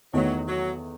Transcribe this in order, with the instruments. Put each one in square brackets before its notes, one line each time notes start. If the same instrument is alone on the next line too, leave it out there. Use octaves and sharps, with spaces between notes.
[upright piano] E2 D#3 A3 [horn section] F#3
[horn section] F#3